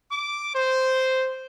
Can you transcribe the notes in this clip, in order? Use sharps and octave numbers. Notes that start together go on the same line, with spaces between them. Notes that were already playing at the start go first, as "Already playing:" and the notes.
D6
C5